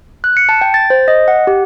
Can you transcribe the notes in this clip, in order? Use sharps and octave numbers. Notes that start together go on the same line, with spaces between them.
F#6
C#7
A5
G5
A6
C5
D#5
F#5
G4